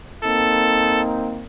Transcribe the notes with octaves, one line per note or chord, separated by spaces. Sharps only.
A#3 C4 D#4 A4